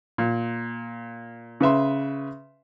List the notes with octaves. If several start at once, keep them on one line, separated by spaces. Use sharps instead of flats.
A#2
C#3 B4 E5 C6